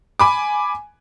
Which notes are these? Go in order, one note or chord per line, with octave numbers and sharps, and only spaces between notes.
G#5 B5 D6